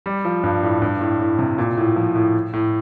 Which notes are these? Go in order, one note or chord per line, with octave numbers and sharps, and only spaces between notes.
G3
F3
G2
A2
G2
A2
A2
C3
A#2
A2
F3
A2
A2